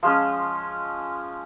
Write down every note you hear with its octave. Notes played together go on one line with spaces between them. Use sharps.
F3 G#3 C#4 F4